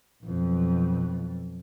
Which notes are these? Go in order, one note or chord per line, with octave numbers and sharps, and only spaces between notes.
B1 F2